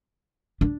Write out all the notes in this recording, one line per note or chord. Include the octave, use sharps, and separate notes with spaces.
D4